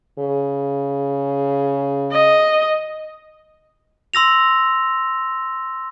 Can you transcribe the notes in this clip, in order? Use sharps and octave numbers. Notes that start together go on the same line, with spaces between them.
C#3
D#5
C6 E6 A#6 F7